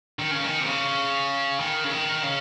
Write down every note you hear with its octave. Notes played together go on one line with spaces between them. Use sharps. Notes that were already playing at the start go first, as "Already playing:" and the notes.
D#3
C#3
D#3
C3
C#3
D#3
C#3
D#3
C#3